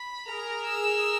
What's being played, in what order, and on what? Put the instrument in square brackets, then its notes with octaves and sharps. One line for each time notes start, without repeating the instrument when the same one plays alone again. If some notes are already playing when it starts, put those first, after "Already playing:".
Already playing: [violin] B5
[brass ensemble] G#4 A#4 [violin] A#5
[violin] E6